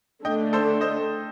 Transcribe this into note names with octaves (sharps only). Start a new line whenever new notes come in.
D3 A3 D4 D#5 G5
A4 C5
C5 D#5